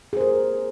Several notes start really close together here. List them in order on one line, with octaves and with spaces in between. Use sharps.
G#4 C5 A#4